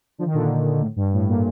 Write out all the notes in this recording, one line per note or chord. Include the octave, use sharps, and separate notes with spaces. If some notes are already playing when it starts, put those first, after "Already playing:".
D3 F3
D#3
A#2 D3
A2
G2
A2
A#2